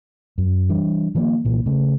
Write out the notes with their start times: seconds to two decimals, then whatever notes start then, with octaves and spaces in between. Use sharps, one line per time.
0.38 F#2
0.69 E3 G3 D4
1.15 D#3 F3 G3 A#3
1.45 C2 A#2 E3
1.66 C#3 A3